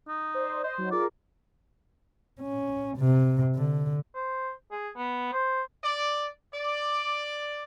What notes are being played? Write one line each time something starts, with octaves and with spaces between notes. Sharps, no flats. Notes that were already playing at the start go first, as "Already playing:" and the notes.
D#4
C5 D5
C5 D#5 C6
F#3 D#4
F4 G#4 A#4 D5
C#4
C3
D3
C5
G#4
B3
C5
D5
D5